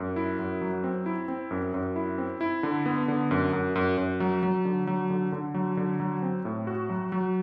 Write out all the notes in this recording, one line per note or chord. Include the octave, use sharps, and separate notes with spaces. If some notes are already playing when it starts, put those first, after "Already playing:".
Already playing: F#2
E4
F#2
F#3
C4
E4
C4
F#2
F#2
E4
C4
E4
D3
B3
D3
F#2
F#2
F#2
F#2
F#3
F#3
D3
F#3
D3
D3
F#3
D3
F#3
C4
A2
F#4
F#3
F#3